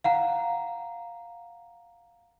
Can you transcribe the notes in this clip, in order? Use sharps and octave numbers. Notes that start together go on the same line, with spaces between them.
F5 F#5 A#5